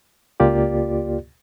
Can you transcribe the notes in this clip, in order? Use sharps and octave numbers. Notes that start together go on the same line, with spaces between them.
C#2 A#3 F4 G4 D5